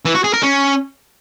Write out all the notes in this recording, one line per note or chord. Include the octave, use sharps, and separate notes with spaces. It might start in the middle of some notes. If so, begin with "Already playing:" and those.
E3
F#4
G#4
A#4
C#4